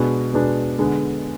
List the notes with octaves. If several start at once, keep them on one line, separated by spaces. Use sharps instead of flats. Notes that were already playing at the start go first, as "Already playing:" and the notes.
Already playing: B2 G#3 B3 D4
B2 G#3 B3 D4
D3 G#3 B3